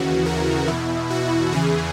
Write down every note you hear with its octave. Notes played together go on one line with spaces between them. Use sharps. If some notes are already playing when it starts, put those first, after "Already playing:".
Already playing: D#2 C#3 E3 F#4
A#4
E2 B2 E4
F#4
E2 C#3 E3 G#4